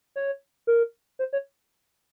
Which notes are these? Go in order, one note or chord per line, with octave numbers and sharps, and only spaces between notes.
C#5
A#4
C5
C#5